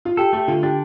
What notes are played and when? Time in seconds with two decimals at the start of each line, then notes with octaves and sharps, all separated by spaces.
0.05 F4
0.17 G4 A4
0.33 A3 G4
0.48 D3 F4
0.63 D4 G4